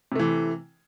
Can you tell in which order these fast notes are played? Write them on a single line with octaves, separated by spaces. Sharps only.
C3 A3 E3